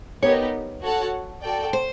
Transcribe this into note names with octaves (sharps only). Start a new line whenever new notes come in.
B3 D#4 G4 A#4 C#5
F#4 A4 C#5 F#5 A5
F#4 A4 D5 G5
C5